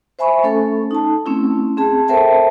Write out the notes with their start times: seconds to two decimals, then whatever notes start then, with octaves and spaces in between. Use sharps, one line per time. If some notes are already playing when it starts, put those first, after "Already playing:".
0.19 C5 E5 G#5 B5 C#6
0.43 A3 C#4 A4 C#6
0.91 D#4 A5
1.26 A3 C4 C#4 E4
1.77 C4 G#4 A5
2.08 A4 A#4 C5 E5 G5 A5